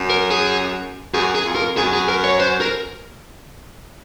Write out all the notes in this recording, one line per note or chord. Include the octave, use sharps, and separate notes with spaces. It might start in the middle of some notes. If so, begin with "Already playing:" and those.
Already playing: F#2
A#4
G#4
F#2 G#4
G#4
F2
A#4
F#2 G#4
G#4
A#4
C#5
C5
A#4